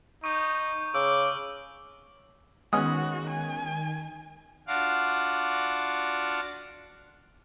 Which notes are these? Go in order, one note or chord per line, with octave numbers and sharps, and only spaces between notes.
D#4 C#6 D#6 G6
C#3 D6 E6 F6
D#3 G#3 B3 C#4 F#4 D#6
G#5
D4 F4 F#4 F5 F#5 D6